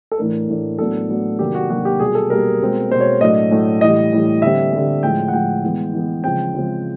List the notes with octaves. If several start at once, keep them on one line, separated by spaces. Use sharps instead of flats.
A4
A2 E3 A3 D4 A#4
A2 E3 A3 D4
A2 F#3 B3 D4 A4
A2 F#3 B3 D4
C3 D#3 F#3 A#3 D4 G4
F#4
C3 D#3 F#3 A#3 D4 F#4
G4
B2 G3 A#3 G#4
A4
B2 G3 A#3 A#4
B2 G#3 C4
B2 G#3 C4 C5
C#5
A2 F#3 A3 D4 D#5
A2 F#3 A3 D4
A2 E3 G3 D#5
A2 E3 G3
D3 G3 C4 E5
D3 G3 C4
A2 F3 G#3 G5
F#5
A2 F3 G#3 G5
E3 G#3 B3
E3 G#3 B3
C#3 F3 G#3 C4 G5
C#3 F3 G#3 C4